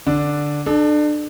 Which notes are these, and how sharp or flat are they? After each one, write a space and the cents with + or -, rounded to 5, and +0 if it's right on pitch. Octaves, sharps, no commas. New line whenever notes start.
D3 +0 D4 +0
D4 +30 A4 -25